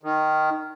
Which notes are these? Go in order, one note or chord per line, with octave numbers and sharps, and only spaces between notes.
D#3